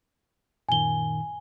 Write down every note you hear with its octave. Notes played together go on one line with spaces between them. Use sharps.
F#2 A#2 D#3 G#5 G7